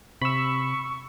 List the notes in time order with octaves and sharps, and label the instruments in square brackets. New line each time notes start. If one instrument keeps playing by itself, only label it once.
[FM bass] C3 [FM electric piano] B5 E6 [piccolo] C#6